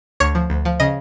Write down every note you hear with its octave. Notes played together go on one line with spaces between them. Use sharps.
D2 C#5
F3
D2
F3
C#3 D#5